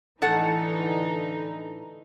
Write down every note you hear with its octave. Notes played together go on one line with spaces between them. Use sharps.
A2 D3 E3 D#4 A4 F#5